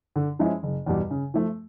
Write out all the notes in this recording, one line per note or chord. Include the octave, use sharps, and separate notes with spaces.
D3
F3 G#3 C#4 E4
F#1
E2 B2 G3
C#3
F3 A3